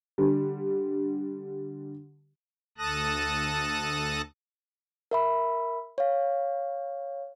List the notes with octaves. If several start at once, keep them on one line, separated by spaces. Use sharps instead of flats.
D3 G3
D2 A4 A5 D#6 F#6 A#6
A#4 E5 B5
C#5 F5